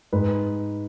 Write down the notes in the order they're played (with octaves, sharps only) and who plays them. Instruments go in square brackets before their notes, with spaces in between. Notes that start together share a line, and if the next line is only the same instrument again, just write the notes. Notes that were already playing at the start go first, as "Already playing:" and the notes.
[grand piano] G#2 B4